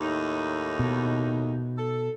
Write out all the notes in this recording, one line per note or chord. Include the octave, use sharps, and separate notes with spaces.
D#2 A2 D#4
B2
A4